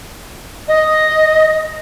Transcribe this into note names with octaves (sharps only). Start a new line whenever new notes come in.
D#5